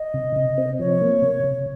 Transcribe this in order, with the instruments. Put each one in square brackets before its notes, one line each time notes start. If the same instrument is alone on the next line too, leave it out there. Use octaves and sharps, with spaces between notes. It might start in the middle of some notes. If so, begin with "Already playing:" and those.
Already playing: [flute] D#5
[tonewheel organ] C3
C3
C4
[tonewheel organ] F3 [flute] C#5
[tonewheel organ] A#3
C3
C3